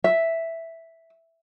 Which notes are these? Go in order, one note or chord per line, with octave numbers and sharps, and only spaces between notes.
E5